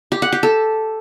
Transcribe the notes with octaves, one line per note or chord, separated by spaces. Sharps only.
G4
F#5
G4
A4